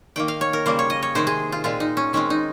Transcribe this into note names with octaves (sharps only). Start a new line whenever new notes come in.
D#3 A#3 G5
F5
C#5
A#4
C#3 G3 A#3 C5
C#5
D#5
C#5
C3 D#3 G#3 C4 C5
G#4
F4
A#2 G#3 C4 F4
D#4
C#4
D#3 G#3 C4 C#4
D#4